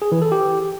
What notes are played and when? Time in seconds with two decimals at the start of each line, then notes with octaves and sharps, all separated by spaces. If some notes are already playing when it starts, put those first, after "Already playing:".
0.02 G#4
0.12 E3
0.22 A4
0.32 G4